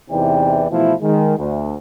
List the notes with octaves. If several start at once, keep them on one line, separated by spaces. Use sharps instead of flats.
E2 C3 E3 D#4 D5 G5
B2 E3 F3 A3 E4
D#3 G#3
D2